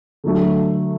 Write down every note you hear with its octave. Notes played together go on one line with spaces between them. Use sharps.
D3 F#3 A3